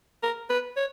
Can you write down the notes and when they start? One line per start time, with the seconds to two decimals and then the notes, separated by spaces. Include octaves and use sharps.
0.23 A#4
0.50 B4
0.77 C#5